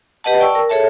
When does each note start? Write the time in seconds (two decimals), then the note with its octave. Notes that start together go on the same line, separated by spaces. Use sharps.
0.24 G4 B4 D#5 F#5 A5
0.40 D5 G5 A5 C#6 E6
0.55 A#4
0.69 G#4 A4 C#5 E5 A5